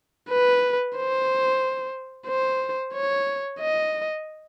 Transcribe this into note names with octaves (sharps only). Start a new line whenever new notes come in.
B4
C5
C5
C#5
D#5